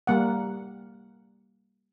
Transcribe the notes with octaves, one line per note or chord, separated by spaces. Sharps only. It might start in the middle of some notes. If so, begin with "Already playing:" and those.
G3 A#3 F#5